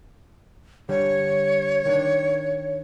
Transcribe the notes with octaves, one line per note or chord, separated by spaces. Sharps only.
D3 G3 C#5
D#3 D4